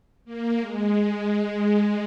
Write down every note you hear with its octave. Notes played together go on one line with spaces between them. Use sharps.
A#3
G#3
G#3